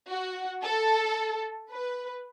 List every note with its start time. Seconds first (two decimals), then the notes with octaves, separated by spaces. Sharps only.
0.09 F#4
0.63 A4
1.70 B4